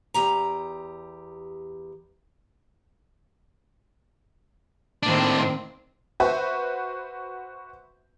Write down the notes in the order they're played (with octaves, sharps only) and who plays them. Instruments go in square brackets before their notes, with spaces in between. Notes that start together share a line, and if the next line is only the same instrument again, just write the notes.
[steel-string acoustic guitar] E2 G4 A#5
[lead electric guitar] A2 D4 [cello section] D#3 A#3 C4
[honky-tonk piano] F#4 B4 C5 E5